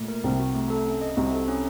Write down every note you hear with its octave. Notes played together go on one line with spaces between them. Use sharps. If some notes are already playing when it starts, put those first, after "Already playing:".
Already playing: A#2 A3
A#4
C2 C3 C4
F#4
A3
A4
C#4
D#5
C2 C3 F#4
A4
C#4